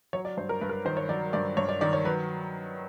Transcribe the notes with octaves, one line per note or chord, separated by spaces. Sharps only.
F#3 C#5
D5
G2 C5
A#4
G2 B4
A#4
B4
D#3 C5
C#5
F#3 D5
G2 D5
G2 C#5
D5
D#3 D5
C#5
F#3 B4